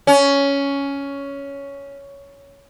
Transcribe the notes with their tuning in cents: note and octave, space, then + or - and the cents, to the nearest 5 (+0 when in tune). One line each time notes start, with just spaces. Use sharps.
C#4 +10